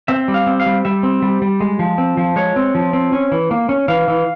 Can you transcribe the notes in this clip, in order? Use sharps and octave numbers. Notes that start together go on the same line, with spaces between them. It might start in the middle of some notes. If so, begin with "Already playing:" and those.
C4 E5
G3
F5
C4
F5
G3
G3 E5
C4
G3
G3
G#3
F3
C4
F3
G#3 C#5
C4
F3
C4
C#4
E3
A#3
C#4
E3 F5
E3